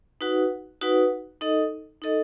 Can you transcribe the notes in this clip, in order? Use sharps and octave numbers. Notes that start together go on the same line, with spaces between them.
D#4 F#4 B4 F#5
D#4 F#4 B4 F#5
D#4 A4 D#5
D#4 A4 D#5